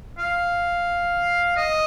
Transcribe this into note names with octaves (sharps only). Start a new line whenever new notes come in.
F5
D#5